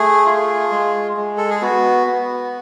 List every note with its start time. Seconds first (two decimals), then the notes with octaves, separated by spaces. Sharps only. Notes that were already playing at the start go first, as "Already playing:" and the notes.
Already playing: A3 G#4
0.26 F4
0.71 G#3
1.17 G#3
1.38 A4
1.50 G#4
1.62 B3 F#4
2.07 B3